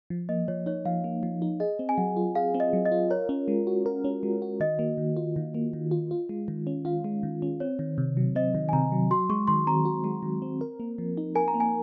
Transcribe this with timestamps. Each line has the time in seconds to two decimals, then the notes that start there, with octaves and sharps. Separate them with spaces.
0.10 F3
0.29 A#3 D#5
0.48 F3 C#5
0.66 D#4 C#5
0.85 F3 F5
1.04 A#3
1.23 F3
1.42 D#4
1.60 G#4 D#5
1.79 C4
1.89 G#5
1.98 F#3 F#5
2.16 F4
2.35 G#4 F5
2.55 C4
2.60 D#5
2.73 F#3
2.85 D#5
2.92 F4
3.10 A#4 C#5
3.29 C#4
3.48 G#3
3.67 F#4
3.86 A#4
4.04 C#4
4.23 G#3
4.42 F#4
4.60 D#3 D#5
4.79 A#3
4.98 D#3
5.17 F4
5.36 D#3
5.54 A#3
5.73 D#3
5.91 F4
6.11 F4
6.29 G#3
6.48 D#3
6.67 C#4
6.85 F4 F5
7.04 G#3
7.23 D#3
7.42 C#4
7.60 C4 C#5
7.79 D#3
7.98 C3
8.17 F#3
8.35 C4 D#5
8.55 D#3
8.69 G#5
8.73 C3 A#5
8.92 F#3
9.11 F#4 C6
9.30 G#3 C#6
9.47 D#3 C6
9.67 C4 A#5
9.85 F#4
10.04 G#3
10.23 D#3
10.42 C4
10.61 A#4
10.80 A#3
10.98 F3
11.17 D#4
11.35 A#4 G#5
11.48 A#5
11.54 A#3
11.60 G#5